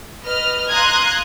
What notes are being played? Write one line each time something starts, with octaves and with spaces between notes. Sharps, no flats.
B4 D#5 F6
F5 A#5 C6 D#6 F#6 G#6